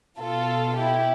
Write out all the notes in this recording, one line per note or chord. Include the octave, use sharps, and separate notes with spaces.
B2 F4 A4
E4 G4